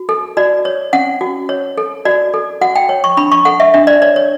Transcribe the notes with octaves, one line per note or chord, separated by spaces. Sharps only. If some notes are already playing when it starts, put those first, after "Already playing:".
Already playing: F#4
A4
F#4 D5
C#5
C#4 F#5
F#4
C#5
A4
F#4 D5
A4
F#4 F#5
G5
C#5
C#6
D4 B5
C#6
A4 F#5
E5
D4 E5
D5
C#5 D5
C#5